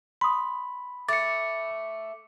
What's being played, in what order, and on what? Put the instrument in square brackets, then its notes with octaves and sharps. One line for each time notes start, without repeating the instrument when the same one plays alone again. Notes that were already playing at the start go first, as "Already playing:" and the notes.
[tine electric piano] B5 [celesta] C6 D#6
[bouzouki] A3 [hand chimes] D6 C#7 [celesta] A6